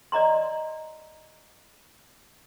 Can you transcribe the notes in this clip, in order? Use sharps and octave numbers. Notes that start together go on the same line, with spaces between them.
D5 D#5 A#5 C6